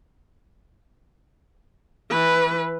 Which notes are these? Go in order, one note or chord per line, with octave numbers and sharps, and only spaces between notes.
E3 B4